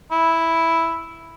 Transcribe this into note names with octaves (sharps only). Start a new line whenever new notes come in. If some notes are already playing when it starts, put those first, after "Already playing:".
E4